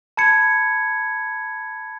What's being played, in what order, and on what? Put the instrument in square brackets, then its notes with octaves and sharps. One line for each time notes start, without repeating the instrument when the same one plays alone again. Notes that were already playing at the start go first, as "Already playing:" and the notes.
[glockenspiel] A5 B5 G#6 C#7